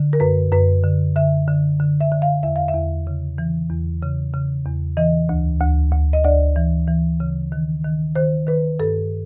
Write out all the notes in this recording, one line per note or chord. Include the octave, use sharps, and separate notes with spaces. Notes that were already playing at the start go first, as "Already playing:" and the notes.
Already playing: D3
A#4
F#2 B4
F#2 B4
D3
D3 E5
D3
D3
E5
D3
F5
E2 E5
F5
E5
E2
C#3
E3
E2
C#3
C#3
E2
E3 D#5
D2
D2
D2
D#5
D2 D5
E3
E3
C#3
D#3
D#3
D#3 C5
D#3 B4
G2 A4